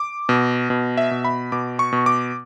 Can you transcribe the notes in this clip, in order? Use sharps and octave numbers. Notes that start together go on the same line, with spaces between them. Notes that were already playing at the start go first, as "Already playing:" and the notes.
Already playing: D6
B2
B2
E5
B2
B5
B2 D6
C#6
B2
D6